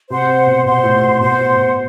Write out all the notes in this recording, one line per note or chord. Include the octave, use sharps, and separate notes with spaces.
C3 C5 F#5 C6
B2
B2 C5 F#5 C6
A2
A2
B2 C5 F#5 C6
A2
B2